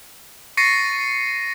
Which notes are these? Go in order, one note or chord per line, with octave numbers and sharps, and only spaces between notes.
C#6 A6 A#6 C7 C#7 D#7